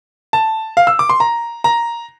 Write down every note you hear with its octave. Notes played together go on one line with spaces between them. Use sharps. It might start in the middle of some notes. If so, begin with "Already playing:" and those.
A5
F5
E6
D6
C6
A#5
A#5